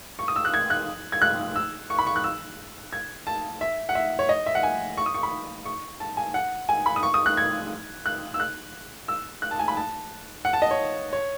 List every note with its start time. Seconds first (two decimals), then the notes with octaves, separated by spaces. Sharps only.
0.19 C#6
0.28 D#6
0.36 E6
0.45 F#6
0.54 G#6
0.70 F#6
1.12 G#6
1.22 F#6
1.56 E6
1.90 C#6
1.99 B5
2.07 C#6
2.16 F#6
2.24 E6
2.93 G#6
3.27 A5
3.61 E5
3.89 F#5
3.95 E5
4.19 C#5
4.29 D#5
4.46 E5
4.55 F#5
4.63 G#5
4.97 C#6
5.06 D#6
5.15 C#6
5.23 B5
5.66 C#6
6.00 A5
6.17 G#5
6.34 F#5
6.69 G#5
6.86 B5
6.96 D#6
7.03 C#6
7.14 D#6
7.26 F#6
7.37 G#6
8.06 F#6
8.34 E6
8.40 F#6
9.08 E6
9.42 F#6
9.51 A5
9.59 G#5
9.68 B5
9.77 A5
10.45 F#5
10.53 A5
10.62 D#5
10.71 C#5
11.13 C#5